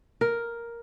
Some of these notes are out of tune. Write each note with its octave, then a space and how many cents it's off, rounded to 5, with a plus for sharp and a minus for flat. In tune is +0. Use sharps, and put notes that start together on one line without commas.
A#4 +5